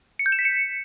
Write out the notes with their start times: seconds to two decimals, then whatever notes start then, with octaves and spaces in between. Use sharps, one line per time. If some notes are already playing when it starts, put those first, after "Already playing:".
0.19 C#7
0.26 G6
0.32 E7
0.39 B6
0.45 C#7